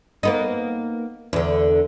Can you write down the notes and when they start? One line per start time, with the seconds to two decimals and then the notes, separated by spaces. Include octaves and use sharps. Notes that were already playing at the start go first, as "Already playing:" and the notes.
0.23 A#3 B3 D#4
1.33 E2 D3